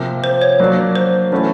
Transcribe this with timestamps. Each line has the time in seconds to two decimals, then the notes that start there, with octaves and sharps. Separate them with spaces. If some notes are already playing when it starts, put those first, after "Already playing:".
Already playing: C3 F3 A#3
0.24 C5
0.41 C#5
0.60 F#3 A#3 D4 F#4
0.95 C5
1.32 E3 A3 C#4 F#4